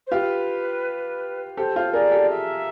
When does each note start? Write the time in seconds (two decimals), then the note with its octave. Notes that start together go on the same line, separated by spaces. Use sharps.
0.07 C5
0.11 F4 G4 B4
1.57 G4 A4 C5
1.76 F4 G4
1.93 G#4 A#4 D5
2.12 G4 A4
2.30 E5